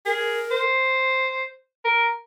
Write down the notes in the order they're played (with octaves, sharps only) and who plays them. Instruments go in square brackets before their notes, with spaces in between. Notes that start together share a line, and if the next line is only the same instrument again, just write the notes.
[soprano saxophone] G#4 [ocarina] A#4
[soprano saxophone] C5
A#4